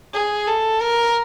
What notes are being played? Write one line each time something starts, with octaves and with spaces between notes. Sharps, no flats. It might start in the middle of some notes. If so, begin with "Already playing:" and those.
G#4
A4
A#4